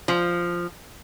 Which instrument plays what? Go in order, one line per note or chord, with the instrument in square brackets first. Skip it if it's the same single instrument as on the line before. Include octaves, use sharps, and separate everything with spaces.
[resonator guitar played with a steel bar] F3